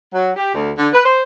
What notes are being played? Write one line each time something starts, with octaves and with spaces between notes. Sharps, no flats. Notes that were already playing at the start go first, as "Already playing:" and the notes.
F#3
G4
D2
D3
B4
C5